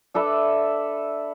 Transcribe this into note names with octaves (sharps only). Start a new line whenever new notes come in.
D4 A4 B4 E5